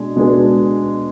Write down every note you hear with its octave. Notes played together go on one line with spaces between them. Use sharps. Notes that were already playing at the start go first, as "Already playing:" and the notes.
Already playing: B2 G#3 D4 G#4
B2 G#3 D4 G#4 B4